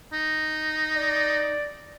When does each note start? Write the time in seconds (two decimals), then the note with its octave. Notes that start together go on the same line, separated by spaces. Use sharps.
0.13 D#4
0.97 D5